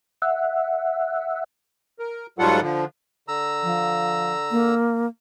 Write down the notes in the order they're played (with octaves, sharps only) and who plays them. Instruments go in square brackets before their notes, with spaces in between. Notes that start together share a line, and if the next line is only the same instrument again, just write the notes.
[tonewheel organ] E5 F#5
[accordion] A#4
G#2 F#3 G3 F4 A4 F#5
D3 F3
[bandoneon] D3 A#5 E6
[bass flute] F3
A#3